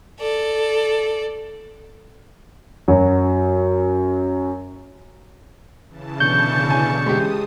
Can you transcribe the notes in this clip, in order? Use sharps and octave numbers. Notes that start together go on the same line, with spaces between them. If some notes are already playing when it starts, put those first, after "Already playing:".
A4 D5
F#2 F#3
C#3 E3 A5
B2 D3 C#6 G6
G#5
G#3 G4 D#6